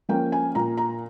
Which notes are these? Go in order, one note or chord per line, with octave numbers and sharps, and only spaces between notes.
F3 A#3 C#4 G5
G#5
A#2 A#5
A#5